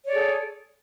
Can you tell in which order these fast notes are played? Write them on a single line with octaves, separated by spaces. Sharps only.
C#5 D5 G#4 A4